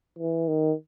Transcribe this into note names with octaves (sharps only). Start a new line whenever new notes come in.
E3
D#3